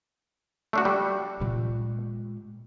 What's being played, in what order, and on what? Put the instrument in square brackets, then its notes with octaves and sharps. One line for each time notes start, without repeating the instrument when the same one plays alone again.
[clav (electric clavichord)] A3 D4 F#4
G3
[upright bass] A#2 G#3